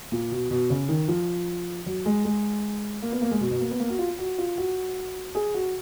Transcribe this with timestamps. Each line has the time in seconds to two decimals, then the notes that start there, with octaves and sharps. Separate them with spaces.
0.12 A#2
0.31 B2
0.50 B2
0.70 C#3
0.89 D#3
1.08 F3
1.86 F#3
2.06 G#3
2.25 G#3
3.02 A#3
3.12 B3
3.22 A#3
3.31 G#3
3.41 B2
3.51 B2
3.61 A#3
3.70 B3
3.80 A#3
3.89 F#4
3.99 F4
4.19 F#4
4.38 F4
4.58 F#4
5.35 G#4
5.54 F#4